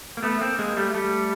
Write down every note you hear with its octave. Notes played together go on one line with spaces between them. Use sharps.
A#3
A3 B3
A#3 C4
G#3 A#3
G3 A3
G3 A3